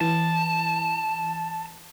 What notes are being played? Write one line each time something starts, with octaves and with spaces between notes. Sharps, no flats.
E3 A5